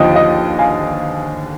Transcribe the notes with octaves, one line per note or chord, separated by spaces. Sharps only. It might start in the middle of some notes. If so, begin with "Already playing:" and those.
Already playing: D#2 D3 F3 D#5 G5
D#5
F5 G#5